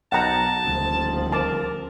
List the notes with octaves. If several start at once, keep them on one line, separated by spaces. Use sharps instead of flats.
B1 F#5 G5 A5 A#5
D#1 D2 F3
A#4 A5 D6